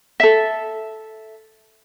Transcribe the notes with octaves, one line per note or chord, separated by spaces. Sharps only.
A4 E5